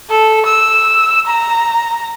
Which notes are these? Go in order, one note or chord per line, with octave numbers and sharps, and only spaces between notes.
A4
E6
A#5